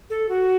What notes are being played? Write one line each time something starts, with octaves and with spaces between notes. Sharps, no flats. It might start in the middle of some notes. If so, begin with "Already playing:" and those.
A4
F#4